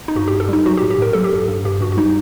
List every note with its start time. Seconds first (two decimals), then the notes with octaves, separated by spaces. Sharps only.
0.08 D#4
0.16 G2 F#4
0.28 G4
0.33 G2
0.40 A4
0.49 G3 D#4
0.66 F#3 F#4
0.77 G4
0.82 A2
0.90 G4
0.98 A2 A#4
1.13 F#3 A4
1.24 G4
1.32 G2 A4
1.48 G2
1.65 G2 G4
1.81 G2 F#4
1.92 F#4
1.97 G3 D#4